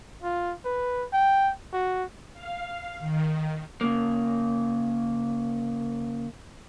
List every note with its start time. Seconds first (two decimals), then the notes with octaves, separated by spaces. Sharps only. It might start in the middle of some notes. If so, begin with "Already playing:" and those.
0.23 F4
0.65 B4
1.13 G5
1.73 F#4
2.33 F5
2.99 D#3
3.81 C#3 A#3